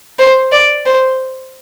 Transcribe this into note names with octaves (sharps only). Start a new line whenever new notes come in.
C5
D5
C5